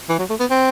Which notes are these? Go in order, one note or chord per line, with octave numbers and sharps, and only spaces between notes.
E3
F#3
A3
B3
C4